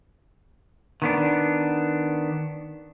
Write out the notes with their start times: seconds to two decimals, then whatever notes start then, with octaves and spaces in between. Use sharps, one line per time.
1.02 D#3 B3 D4